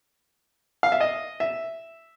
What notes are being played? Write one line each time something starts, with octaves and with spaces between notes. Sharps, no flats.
F5
E5
D#5
E5